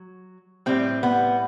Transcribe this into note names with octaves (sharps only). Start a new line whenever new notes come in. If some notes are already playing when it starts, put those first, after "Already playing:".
Already playing: F#3
A2 G3 C4
B3